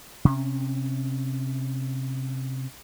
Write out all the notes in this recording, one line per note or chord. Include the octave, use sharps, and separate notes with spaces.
C3 C#4